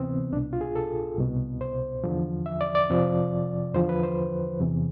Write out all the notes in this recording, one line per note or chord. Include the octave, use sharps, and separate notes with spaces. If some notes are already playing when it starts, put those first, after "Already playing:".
Already playing: D2 C3 E3 B3 C4
C2 B2 D4
F4
G#4
A4
C2 B2
C5
E2 D3 F3
E5
D5
D5
F2 C3 F3
E2 D3 F3 C5
B4
C5
E2 C3 E3